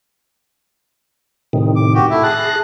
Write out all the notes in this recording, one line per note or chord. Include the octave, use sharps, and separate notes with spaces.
A2 C3 D#3
D6
F#4 G4
A3 E4 E5
G#4 A5 F#6 A#6